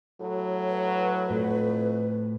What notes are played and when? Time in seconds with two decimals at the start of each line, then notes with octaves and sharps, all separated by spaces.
0.20 A2 F#3
0.70 B4
1.30 F2 A2